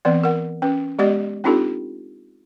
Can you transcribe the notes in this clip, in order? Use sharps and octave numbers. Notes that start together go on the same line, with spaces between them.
E3 B3 C4 D5
A#4 F#5
C#4 B4
G#3 B3 G4 D5 D#5
C4 D4 D#4 F4 G4 A4